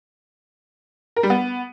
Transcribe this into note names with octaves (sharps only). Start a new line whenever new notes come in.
A#4
G3
B3